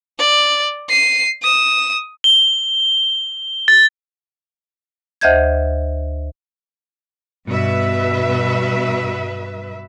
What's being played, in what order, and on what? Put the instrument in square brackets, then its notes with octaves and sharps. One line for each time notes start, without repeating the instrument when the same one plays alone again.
[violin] D5
C7 D#7
D#6 E7
[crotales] G7
A6
[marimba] D2 C5 D#5 E5 G6 G#6
[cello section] G2 B2 B4 E5